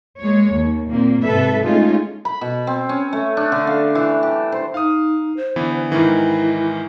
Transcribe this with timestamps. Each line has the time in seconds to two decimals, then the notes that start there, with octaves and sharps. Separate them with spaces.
0.18 G#3 A#3 C#5
0.52 D#2
0.88 A#2 A#3 C4
1.22 G#2 C3 A4 B4 E5
1.64 G#3 A3 C#4 D#4 F4 G#4
2.25 B5
2.41 B2
2.67 C4
2.89 C#4
3.13 A3
3.37 D4
3.52 D3
3.67 F5
3.95 E3
4.23 G4
4.52 C5
4.74 D#4 F5 D#6
5.37 C5
5.56 D3 E3 B3
5.92 G#2 D#3 E3 E4